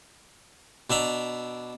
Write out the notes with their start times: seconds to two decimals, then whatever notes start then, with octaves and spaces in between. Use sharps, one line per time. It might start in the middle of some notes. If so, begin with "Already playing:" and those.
0.90 B2 D4 E5 A#5 B5